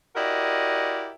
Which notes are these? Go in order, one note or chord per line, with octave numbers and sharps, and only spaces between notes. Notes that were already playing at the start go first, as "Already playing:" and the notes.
E4 F#4 G4 A#4 D5 D#5